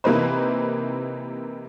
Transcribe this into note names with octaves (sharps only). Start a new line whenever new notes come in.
C3 E3 A#3 D#4 B4 C5